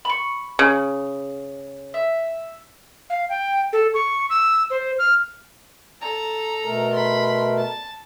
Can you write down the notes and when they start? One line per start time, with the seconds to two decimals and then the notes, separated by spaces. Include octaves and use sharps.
0.05 B5 C#6
0.59 C#3
1.94 E5
3.10 F5
3.30 G5
3.73 A4
3.94 C#6
4.30 E6
4.70 C5
4.99 F6
6.01 A4 A#5
6.65 B2 A3 A#4
6.93 B5 C6
7.57 A5